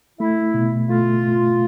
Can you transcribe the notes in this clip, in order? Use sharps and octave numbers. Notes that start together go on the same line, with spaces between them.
A3 E4
B2
A3 F4